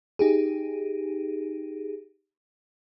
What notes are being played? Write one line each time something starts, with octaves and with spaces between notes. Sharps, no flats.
D#4 G4 G#4